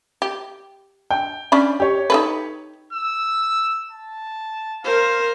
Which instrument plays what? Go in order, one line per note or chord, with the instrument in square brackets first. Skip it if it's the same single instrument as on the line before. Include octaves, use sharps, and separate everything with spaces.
[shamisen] G4
[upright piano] G5
[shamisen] C#4 D4 B5
[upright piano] G4 C#5
[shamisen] D#4 A4 B4
[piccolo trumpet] E6
A5
[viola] A#4 C5 [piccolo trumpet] F5